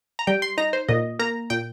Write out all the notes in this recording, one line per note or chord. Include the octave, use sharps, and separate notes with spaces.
A#5
G3 G5
C6
D#4 A#5
C5
A#2 D#5
A#3 A#5
A#2 G5